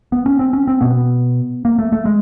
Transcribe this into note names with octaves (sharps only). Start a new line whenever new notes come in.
B3
C#4
C4
C#4
C4
B2 B3
A#3
A3
A3
G#3